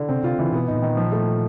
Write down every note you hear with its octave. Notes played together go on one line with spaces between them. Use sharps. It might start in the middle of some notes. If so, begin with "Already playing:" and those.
Already playing: D3
C3 C4
C3 F4
C#3 E3
B2 B3
A2 D#4
A#2
D#3
F3
A3